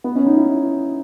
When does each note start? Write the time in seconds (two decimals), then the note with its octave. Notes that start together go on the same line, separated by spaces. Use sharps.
0.04 B3
0.15 C#4
0.26 D#4
0.37 E4